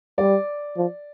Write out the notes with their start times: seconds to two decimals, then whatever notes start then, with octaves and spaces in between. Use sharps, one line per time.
0.18 G3 D5
0.77 F3